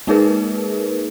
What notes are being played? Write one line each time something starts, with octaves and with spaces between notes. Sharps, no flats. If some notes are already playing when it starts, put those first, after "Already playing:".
G#3 A#3 D#4 G#4 A#4 B4